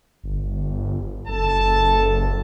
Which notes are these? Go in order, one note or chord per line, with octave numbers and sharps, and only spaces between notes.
G1
F#1 A4 A5